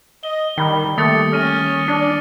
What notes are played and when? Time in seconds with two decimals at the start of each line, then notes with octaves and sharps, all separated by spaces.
0.23 D#5 G7
0.58 D#3 G3 G5 B5
0.98 D#3 G3 A3 A#3 G4 D#6 A6 C#7
1.32 C#4 F6 A#6 D#7
1.88 D4 D5